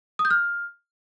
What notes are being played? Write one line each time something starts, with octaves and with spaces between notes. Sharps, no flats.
D#6
G6
F6